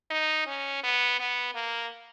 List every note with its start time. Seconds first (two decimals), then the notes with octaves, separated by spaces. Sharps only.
0.11 D#4
0.47 C#4
0.84 B3
1.20 B3
1.55 A#3